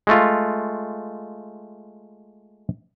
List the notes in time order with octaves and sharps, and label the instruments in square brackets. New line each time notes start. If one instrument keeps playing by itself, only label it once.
[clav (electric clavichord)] G#3 A3 F4